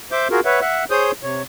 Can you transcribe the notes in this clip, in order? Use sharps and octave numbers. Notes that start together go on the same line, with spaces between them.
C5 E5 D6 G6
F4 F#4 G#4 A#4
B4 C#5 E5 F#5
E5 F#5
G#4 C5 C#5 D#6 G6
C3 C#5